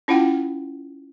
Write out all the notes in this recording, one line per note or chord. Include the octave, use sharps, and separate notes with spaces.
C#4 E4 F4 F#5 G5